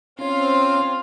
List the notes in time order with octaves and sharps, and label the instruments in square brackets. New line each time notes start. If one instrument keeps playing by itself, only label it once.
[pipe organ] C4 F5 [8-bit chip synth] C#4 C#5 [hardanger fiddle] F4